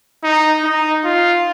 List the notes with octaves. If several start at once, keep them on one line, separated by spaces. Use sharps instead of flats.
D#4
D#4
F4